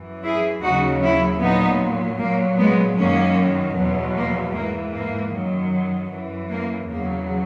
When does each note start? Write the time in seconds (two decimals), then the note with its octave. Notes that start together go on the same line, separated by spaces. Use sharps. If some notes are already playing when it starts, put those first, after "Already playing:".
Already playing: F#2 E3
0.24 E4 G#4
0.63 D#2 C#3 F#3 D#4 F#4
1.02 C#4 E4
1.42 A#2 F#3 B3 D#4
2.20 A#2 F#3 A#3
2.59 G#3 B3
2.98 F#2 D#3 F#3 A#3 C#4
3.76 E2 B2 F#3
4.16 A#3
4.54 G#2 E3 A#3
4.94 A#3
5.33 F#2 D#3 F#3
6.11 F#2 E3
6.51 A#3
6.89 E2 C#3 F#3 A#3